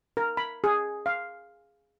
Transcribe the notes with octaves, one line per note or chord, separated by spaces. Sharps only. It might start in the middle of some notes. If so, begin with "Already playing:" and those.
A#4
B5
G#4
F5